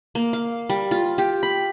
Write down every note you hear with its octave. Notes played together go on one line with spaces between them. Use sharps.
A#3
F5
G3
F4
G4
B5